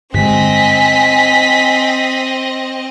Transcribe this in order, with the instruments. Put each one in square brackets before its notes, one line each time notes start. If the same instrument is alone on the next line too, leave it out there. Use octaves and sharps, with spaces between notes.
[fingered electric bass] G2 D3 G#3 [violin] C4 D#5 [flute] G#5 [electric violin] B6